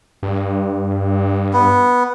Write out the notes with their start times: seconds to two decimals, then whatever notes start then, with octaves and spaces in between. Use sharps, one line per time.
0.23 G2
1.53 B3